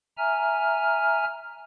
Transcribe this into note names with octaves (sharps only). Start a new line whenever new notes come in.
E5 G#5 A#5 F6